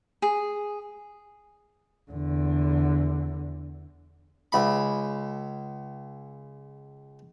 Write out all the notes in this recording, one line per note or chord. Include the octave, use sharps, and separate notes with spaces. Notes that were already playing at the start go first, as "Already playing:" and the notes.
G#4
E2 D3
C#2 B5